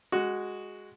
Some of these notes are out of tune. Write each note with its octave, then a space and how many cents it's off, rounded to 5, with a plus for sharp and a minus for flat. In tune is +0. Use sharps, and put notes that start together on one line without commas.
G#3 -5 F#4 +0